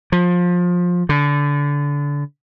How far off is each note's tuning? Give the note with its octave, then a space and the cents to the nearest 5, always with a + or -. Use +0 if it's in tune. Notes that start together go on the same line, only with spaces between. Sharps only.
F3 +20
D3 -25